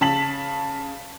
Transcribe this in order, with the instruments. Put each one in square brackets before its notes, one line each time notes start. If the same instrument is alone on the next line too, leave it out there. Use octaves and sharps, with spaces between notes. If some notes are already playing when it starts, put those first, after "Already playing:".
[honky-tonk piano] C#3 A5 B6 F#7